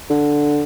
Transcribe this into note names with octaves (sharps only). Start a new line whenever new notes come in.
D3